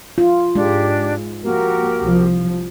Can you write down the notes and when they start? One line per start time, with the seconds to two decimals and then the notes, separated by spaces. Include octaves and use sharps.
0.18 F4
0.55 G#2 G#3 D4 G4
1.44 F3 A#3 F#4 G4 A#4
2.00 C2 F3